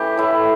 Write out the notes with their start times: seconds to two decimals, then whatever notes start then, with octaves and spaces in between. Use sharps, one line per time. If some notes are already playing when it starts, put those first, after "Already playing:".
Already playing: E3 A3 C#4 G4
0.17 A2 E4